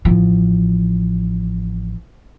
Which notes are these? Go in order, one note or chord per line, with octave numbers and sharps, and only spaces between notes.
A1 F3